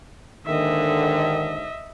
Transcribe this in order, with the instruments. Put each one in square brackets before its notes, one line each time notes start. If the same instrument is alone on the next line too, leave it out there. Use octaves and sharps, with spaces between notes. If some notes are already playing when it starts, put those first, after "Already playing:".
[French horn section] D#2 G#2 D3 [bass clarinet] D#3 [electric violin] D#5 E5